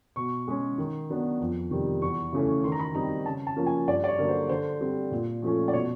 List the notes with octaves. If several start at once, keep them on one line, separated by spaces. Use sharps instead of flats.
B2 C#6
G#3 C#4
D#3
F#3 B3 D4
F2
C3 D#3 G3
E2 C#6
C#3 E3 A3 C#4
D#3 C6
A#5
B5
G3 C4 D#4 A#5
C#3 A5
A5
F3 A#3 C#4
G#5
G2 D5
D5
C#5
D3 F#3 A#3
C5
D3 C5
G3 C4
A#2
F3 A3 C#4
D5
B2 C#5